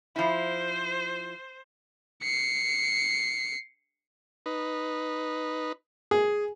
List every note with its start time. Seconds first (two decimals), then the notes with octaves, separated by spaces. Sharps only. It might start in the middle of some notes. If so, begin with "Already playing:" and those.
0.16 F3 E4 C5
2.23 C7 C#7
4.46 D#4 B4
6.11 G#4